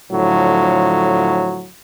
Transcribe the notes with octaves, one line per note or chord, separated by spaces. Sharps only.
A2 D3 F3 F#3